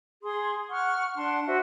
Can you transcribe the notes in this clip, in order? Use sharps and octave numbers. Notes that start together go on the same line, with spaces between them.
G#4 C6 D#6
F#5 C#6 F6
D4 F#5 A5 C6
F#4 C5 E5